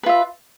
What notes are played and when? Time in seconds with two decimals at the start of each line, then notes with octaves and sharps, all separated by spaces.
0.03 B4
0.06 F4
0.09 E5